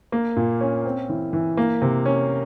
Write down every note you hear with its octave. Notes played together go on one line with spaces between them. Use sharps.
A#3
A#2
C#4
C4
E3
E3
A#3
C3
C#4